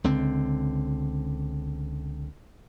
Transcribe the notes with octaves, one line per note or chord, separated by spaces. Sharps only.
C#2 D3 C4